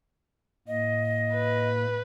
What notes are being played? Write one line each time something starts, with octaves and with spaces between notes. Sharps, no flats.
A2 A#3 D#5
B4